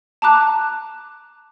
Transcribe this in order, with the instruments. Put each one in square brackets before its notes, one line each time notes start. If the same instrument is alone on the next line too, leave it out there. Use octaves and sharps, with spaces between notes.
[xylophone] A5 A#5 D6 F#6